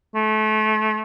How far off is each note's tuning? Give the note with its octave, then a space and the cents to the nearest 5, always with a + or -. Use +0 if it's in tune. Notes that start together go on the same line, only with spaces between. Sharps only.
A3 -30